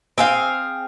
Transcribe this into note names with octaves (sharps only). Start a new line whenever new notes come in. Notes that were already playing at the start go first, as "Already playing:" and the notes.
C4 G#4 F5